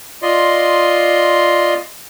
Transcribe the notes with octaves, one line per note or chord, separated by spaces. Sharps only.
F4 D5 D#5 C6